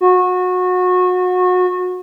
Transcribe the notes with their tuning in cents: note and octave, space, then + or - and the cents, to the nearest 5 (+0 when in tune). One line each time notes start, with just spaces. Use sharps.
F#4 -25